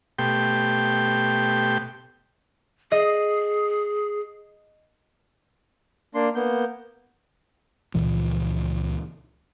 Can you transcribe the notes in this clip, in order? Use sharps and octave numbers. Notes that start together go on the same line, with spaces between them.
B2 A3 G4 G5 C6
G#4 D#5
A#3 D4 C6
A#3 B3 G6
C#2 A#2 E3 F3